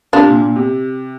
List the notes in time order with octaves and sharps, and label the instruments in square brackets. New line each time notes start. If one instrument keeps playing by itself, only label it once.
[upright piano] C3 [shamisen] D4 F4
[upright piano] A#2
A#2
C3